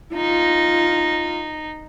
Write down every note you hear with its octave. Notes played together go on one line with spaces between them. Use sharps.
D#4 F4